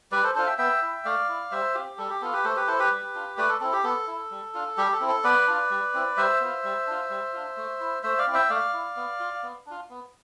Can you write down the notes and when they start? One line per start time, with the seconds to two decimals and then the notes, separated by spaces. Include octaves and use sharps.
0.12 G3 B4 D5
0.23 A4 C5
0.35 D4 F4 A4 C5
0.47 E5 G5
0.58 B3 E5 G5
0.82 E4
1.05 A3 D5 F5
1.28 E4
1.51 G3 C5 E5
1.74 C4 F4 G4
1.98 G3 A4
2.10 G4
2.21 B3 F4 A4
2.33 G4 B4
2.44 A3 A4 C5
2.56 G4 B4
2.67 E4 A4 C5
2.79 G4 B4
2.91 G3
3.14 D4 F4
3.38 A3 B4 D5
3.49 A4
3.61 C4 E4 A4
3.72 G4
3.84 B3 A4
4.07 E4
4.31 G3
4.54 D4 F4
4.77 G3 G4
4.93 A4
5.00 C4 E4
5.08 A4
5.24 B3 B4 D5
5.47 D4 F4
5.70 G3
5.94 C4 E4
6.17 G3 C5 E5
6.40 B3 F4
6.64 G3
6.87 D4 F4
7.10 G3
7.33 D4 F4
7.57 A3
7.80 E4
8.03 A3 C5 E5
8.18 D5 F5
8.27 C4 E4
8.34 E5 G5
8.50 A3 D5 F5
8.73 E4
8.96 B3
9.20 F4
9.43 B3
9.66 D4 F4
9.90 B3